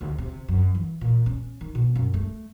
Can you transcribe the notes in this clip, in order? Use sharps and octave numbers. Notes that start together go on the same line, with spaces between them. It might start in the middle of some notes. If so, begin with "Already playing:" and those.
D2
C3
F#2
E3
A#2
C#4
D#3
B2
F#2
A3